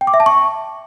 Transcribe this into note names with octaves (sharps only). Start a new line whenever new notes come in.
G5
D6
E5
A5
C#6